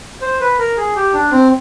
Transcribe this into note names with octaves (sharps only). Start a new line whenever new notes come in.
C5
B4
A#4
G#4
G4
D4
C4